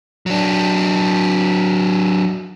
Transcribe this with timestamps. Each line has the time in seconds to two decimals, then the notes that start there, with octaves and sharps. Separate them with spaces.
0.26 F#3 D4